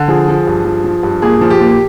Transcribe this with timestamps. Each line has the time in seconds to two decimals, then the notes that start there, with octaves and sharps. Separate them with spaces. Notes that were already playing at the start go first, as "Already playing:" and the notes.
Already playing: D3
0.08 F3 G#4
0.28 F3
0.47 G2
0.65 F3
0.84 F3
1.03 G2
1.22 A#2 G#4
1.41 F3
1.50 G4
1.61 A#2